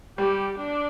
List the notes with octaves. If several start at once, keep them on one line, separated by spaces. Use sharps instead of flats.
G3 G4
D4